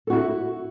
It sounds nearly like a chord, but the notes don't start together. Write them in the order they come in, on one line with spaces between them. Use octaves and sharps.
A4 F#4 E4